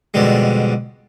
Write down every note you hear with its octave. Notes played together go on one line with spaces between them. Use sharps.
F2 B2 D3 G3 G#3